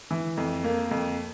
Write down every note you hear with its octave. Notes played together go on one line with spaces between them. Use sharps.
E3
F2
A#3
F2